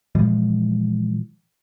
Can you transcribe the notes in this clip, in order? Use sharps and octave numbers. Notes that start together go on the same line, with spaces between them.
A#2 E3 F3 G#3